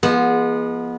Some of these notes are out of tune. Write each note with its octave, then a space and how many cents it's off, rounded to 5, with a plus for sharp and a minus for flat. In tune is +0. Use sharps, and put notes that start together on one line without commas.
F3 -25 G#3 +0 B3 -25